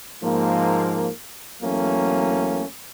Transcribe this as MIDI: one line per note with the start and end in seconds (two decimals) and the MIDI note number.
0.23 1.10 44
0.23 1.10 53
0.23 1.10 58
1.63 2.65 40
1.63 2.65 54
1.63 2.65 57
1.63 2.65 58
1.63 2.65 61